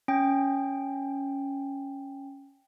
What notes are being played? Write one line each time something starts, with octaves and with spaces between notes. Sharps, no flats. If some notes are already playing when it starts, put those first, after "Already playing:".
C#4 G5